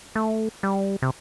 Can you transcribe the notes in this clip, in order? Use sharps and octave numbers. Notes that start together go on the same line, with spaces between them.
A3
G3
C3